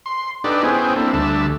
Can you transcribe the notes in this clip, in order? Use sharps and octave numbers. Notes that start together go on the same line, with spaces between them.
C6
D4 D#4 G4 A4 B4 D5
B3 C#4 E4 G#4 C5 G5
A#3 C4 D4 E4 A4
D2 G3 D4 A4 E5 A5